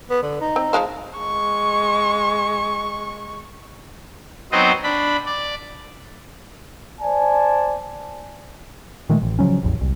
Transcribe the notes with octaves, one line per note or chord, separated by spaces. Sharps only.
B3
D3
D#4
C4
F3 G#3 C5
G#3 C#6
F#3 B3 C4 D#4 C5 D#5
D4 B5
D5
C5 D5 G#5 A5
A#2 D#3 G#3 A3
A1
C#3 F3 F#3 C#4
A1 E2
C2